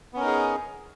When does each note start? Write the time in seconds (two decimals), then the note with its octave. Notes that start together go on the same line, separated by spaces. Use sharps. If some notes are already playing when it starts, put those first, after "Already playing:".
0.13 B3
0.17 C#4
0.20 A#4
0.23 D#4
0.26 G#4